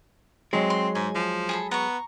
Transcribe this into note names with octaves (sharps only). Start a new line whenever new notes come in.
F#3 G#3 C4
C6
G#2 G#5
F3
G#4 A4 B5
B3 A#5 C#6